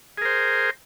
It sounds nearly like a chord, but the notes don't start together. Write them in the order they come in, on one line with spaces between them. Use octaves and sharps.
G#4 A#4 C5